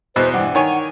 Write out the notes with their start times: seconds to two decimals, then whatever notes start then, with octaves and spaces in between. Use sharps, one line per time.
0.16 E2 B2 C5
0.34 G2 E3 F#5
0.55 D#3 C#5 G#5